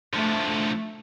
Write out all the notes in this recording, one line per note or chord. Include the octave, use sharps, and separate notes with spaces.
D3 F3 A3